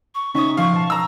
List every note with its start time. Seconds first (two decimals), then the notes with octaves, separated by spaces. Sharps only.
0.15 C#6
0.34 C#3 C#4 D#4 E5 C#6 D#6
0.57 F3 F5 C#6
0.72 B2 A5
0.90 A#5 E6